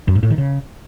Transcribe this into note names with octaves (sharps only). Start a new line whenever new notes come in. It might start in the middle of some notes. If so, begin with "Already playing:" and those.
F#2
G#2
A2
D#3
C#3